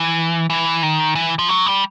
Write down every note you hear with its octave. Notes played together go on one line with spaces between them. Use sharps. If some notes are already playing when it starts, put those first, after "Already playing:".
Already playing: E3
E3
D#3
E3
F3
F#3
G3